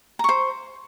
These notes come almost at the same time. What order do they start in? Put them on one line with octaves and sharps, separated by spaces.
A#5 C#6 C5